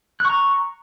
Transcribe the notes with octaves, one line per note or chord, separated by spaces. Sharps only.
A#5 C#6 F#6